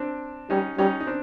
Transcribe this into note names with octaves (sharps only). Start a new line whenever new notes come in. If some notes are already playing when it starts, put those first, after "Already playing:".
Already playing: C4 D4
G3 C#4 D#4
G3 C#4 D#4
D#4
C4 D4